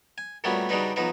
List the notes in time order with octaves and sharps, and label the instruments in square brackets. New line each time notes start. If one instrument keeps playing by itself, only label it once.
[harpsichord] G#5
A#2 F#3 G3 A3 B3 C#4
C#3 F#3 G3 D4 D#4 B4
B1 F3 F#3 D#4 B4